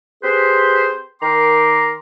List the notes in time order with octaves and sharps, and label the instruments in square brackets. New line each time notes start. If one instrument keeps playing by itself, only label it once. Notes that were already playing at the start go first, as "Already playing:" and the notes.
[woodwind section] C4 G4 G#4 B4 C5
D#3 A#4 G5 A#5 C6 D6